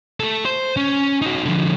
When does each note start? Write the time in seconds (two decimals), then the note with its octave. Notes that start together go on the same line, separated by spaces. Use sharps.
0.20 A3 A4
0.45 C5
0.77 C#4
1.22 D#4 F#4
1.45 D3 F3